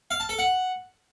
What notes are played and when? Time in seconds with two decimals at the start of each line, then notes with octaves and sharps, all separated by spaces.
0.11 F5
0.20 A5
0.29 A4
0.39 F#5